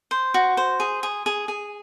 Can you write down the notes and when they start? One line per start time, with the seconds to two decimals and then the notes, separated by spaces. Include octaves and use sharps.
0.11 C5
0.34 F#4
0.57 C5
0.80 G#4
1.03 G#4
1.26 G#4
1.48 G#4